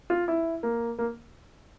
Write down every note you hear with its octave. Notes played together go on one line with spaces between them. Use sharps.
F4
E4
A#3
A#3